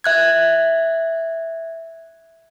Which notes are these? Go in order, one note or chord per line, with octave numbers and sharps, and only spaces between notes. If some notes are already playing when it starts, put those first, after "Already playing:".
E5 F#6 G#6